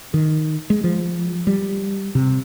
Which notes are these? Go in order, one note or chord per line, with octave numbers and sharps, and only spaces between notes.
D#3
G#3
F3
G3
C3